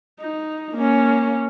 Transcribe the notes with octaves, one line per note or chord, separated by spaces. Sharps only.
D#4
A#3 C#4